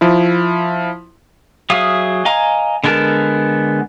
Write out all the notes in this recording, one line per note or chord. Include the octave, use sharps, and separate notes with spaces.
F3 E4
F#3 G#4 E5 F5 D#6
D#5 F5 G#5 A#5
D3 G#3 B3 A#4 A5